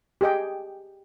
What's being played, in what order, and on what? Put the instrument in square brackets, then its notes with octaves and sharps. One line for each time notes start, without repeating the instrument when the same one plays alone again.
[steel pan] G4 G#4 D#5 G5